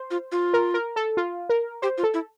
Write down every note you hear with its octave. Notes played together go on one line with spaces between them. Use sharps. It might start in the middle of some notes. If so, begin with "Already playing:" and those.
Already playing: C5
F4
F4
A#4
A#4
A4
F4
A#4
G4 C5
F4
A4
E4